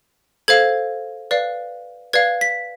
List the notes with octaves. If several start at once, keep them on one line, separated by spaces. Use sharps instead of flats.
A4 C5 F5 G#6
B4 D5 F5
B4 D5 F5 G#6
B6